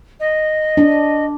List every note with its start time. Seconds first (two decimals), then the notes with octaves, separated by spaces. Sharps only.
0.20 D#5
0.77 D4